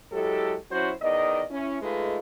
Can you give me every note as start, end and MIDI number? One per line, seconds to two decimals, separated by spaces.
0.12 0.54 54
0.12 0.54 56
0.12 0.54 64
0.12 0.54 67
0.12 0.54 69
0.71 0.91 54
0.71 0.91 61
0.71 0.91 64
0.71 0.91 66
0.71 0.91 72
1.02 1.41 40
1.02 1.41 51
1.02 1.41 74
1.02 1.41 75
1.51 1.80 61
1.51 1.80 64
1.82 2.19 56
1.82 2.19 57
1.82 2.19 63
1.82 2.19 65
1.82 2.19 68
1.82 2.19 71